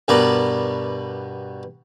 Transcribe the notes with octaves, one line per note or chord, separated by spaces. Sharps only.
G2 B2 B3 A#4 D5